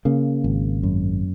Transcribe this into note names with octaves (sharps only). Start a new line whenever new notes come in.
C#3 A#3
G#1
F#2